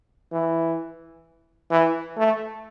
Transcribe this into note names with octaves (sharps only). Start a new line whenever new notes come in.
E3
E3
A3